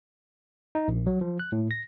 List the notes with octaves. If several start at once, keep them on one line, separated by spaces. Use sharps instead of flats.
D#4
A#1
F#3
F3
F#6
A2
A#6